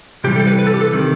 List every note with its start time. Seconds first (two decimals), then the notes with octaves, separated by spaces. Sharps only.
0.24 C3 E3 G3 G4
0.36 A4
0.47 B4
0.59 B4
0.67 A4
0.74 G4
0.81 A4
0.93 C3 D#3